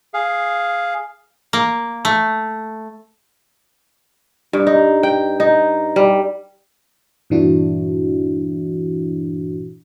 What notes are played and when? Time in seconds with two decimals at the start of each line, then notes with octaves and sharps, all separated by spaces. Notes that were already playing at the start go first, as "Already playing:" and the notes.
0.14 G#4 F5
1.53 A#3
2.05 A3
4.53 G2
4.67 D#4
5.03 G5
5.40 D#4
5.96 G3
7.30 G2 A#2 E3 D4 E4 F#4